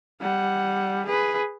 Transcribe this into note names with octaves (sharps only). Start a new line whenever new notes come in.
G3 F#5
G#4 B4